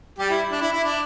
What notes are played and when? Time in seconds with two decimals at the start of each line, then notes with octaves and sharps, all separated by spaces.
0.19 G3 G4
0.30 E4
0.52 D4
0.62 E4
0.73 E4
0.83 D4